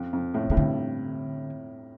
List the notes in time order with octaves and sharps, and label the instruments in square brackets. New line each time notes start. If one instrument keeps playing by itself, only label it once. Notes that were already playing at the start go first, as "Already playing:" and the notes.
Already playing: [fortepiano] F2
F2
A2
[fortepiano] A2 [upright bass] C3
[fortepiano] G2 [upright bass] D3